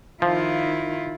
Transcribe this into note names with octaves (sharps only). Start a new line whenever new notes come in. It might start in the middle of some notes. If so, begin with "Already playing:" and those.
D#3 F3 E4 F4